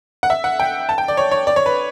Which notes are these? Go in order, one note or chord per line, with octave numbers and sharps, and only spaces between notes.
F#5
E5
F#5
G5
A5
G5
D5
C#5
C#5
D5
C#5
B4